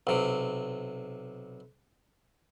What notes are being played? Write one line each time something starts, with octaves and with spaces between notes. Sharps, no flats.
B1 C3